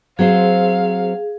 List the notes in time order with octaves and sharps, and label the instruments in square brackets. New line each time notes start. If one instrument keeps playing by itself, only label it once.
[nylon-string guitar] F#3 C4 C5 [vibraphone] G#4 [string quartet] F5